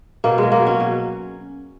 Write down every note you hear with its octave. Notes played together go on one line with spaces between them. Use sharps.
B2 A#3
F#3 G#3
A#3
F#3 C#4
B2